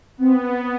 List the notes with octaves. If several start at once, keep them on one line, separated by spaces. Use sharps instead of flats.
B3 C4